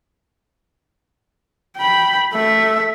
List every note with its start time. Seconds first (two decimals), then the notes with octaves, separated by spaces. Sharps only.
1.77 G5 B5
2.33 A3 E5